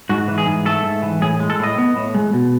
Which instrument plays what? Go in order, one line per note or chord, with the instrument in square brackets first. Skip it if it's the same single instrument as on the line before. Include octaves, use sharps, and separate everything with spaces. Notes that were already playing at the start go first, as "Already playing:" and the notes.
[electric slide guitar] G#2 F#4
E3
G#4
G#2
A3 A4
G#2
E3
A2 G#4
G#3
A4
A2 D#5
B3
A2
G#3
B2